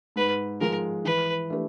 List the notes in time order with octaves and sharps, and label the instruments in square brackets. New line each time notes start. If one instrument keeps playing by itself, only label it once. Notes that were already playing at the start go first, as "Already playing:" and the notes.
[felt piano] G#2 [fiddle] B4
[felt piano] F3 G#3 [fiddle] A#4
[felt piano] E3 [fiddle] B4
[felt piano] A3 D4 G4 B4